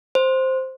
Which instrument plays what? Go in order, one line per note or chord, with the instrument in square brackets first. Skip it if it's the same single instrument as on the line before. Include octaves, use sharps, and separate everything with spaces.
[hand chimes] C5